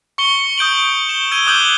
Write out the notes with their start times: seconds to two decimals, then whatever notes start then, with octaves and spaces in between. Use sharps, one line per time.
0.18 C#6 C#7 G7
0.58 D#6 G6 D7 F#7
1.09 E7 G7
1.31 E6 G#6 D#7 G7
1.47 D6 D#6 F#6 G6 F#7 G7